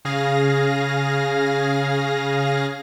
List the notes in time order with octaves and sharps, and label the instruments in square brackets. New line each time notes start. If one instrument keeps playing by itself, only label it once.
[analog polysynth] C#3 G#4 F5 A#6